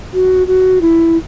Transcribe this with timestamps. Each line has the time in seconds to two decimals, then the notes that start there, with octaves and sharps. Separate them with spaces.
0.13 F#4
0.47 F#4
0.81 E4